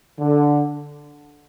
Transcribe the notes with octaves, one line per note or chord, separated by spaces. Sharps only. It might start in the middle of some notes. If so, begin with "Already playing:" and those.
D3